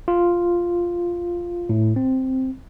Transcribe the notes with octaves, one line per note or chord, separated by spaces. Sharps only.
F4
A2
C4